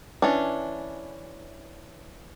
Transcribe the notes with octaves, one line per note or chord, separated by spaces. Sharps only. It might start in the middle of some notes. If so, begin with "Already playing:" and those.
E3 C#4 D4